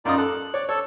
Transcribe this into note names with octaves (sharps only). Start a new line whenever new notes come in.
F#2 D#4 F4 D5 D#6
A4 F#6
C#5 D5
A4 C#5